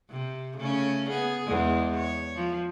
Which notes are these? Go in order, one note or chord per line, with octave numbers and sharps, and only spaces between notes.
C3
C#3 A3 C#4
B3 G#4
E2 G#3
C#5
F3